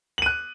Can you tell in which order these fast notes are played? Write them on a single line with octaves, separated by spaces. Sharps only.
F#7 D#7 F#6